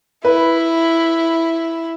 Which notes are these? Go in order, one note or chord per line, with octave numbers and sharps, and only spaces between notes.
E4 B4